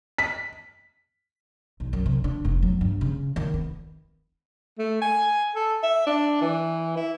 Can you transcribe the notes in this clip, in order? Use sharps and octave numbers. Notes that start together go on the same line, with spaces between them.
B6
B1
F#2
C3
D4
F1
F#3
G2
C#3
D#3
B3
A3
G#5
A4
E5
D4
E3
E4